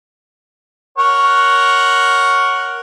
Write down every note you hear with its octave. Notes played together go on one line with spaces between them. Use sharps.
A#4 C#5 F#5